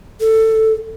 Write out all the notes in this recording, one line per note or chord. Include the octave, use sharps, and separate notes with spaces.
A4